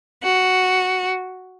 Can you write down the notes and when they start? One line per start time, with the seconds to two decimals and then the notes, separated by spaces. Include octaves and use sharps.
0.24 F#4